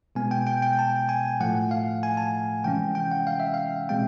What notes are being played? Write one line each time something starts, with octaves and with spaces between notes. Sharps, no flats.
B2 G#3 B3 G#5
G5
G5
G5
A5
G#5
A2 F3 A3 F#5
F5
G#5
A5
C3 E3 G#3 C#4 G5
G5
F#5
F5
E5
F5
B2 G#3 C4 G5